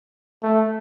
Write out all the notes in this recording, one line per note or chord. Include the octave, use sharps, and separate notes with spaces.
A3